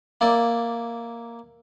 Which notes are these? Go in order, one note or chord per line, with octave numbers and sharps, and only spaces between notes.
A#3 E4 D5